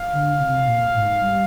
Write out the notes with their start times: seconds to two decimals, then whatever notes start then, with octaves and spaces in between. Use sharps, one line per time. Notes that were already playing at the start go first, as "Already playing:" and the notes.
Already playing: F5
0.12 D3
0.39 C3
0.66 A#2
0.94 G#2
1.21 G3